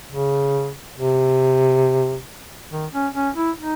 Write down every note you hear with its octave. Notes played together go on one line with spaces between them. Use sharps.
C#3
C3
D#3
C#4
C#4
E4
D#4